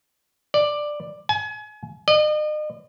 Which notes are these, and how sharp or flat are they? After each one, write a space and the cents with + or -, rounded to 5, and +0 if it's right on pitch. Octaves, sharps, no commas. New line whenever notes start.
D5 +10
G#5 +35
D#5 -40